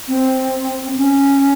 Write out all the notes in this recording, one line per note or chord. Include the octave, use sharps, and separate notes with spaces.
C4
C#4